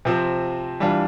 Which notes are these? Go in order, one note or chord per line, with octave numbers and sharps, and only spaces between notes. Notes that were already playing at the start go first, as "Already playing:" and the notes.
C3 F3 C4
E3 G3 D4 F4